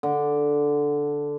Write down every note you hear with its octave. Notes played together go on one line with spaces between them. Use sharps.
D3